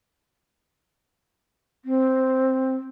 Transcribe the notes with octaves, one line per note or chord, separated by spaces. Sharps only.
C4